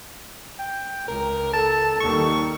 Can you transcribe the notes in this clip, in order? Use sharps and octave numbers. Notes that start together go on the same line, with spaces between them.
G5
C#2 A#4
A4 A5
D#2 D#3 G3 C#6